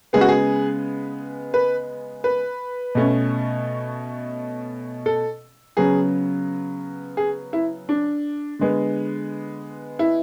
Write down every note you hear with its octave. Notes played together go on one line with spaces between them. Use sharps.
C#3 G#3 B3 G#4
F#4
G#4
B4
B4
B2 A3 C#4
A4
C#3 F#3 B3 G#4
G#4
E4
D4
D3 G#3 B3
E4